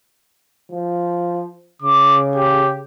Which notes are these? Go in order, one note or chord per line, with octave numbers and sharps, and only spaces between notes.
F3
C#3 D6
G4